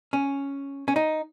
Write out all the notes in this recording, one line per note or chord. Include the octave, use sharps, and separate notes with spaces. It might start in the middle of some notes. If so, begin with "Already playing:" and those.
C#4
C#4
D#4